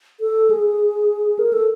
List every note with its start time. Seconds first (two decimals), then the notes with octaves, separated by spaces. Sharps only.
0.20 A4
0.51 G#4
1.39 A#4
1.53 A4